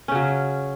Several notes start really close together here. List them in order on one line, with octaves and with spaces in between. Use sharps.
C#4 C#3 F#3